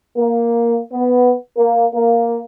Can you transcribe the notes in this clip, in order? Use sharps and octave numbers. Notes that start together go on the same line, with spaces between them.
A#3
B3
A#3
A#3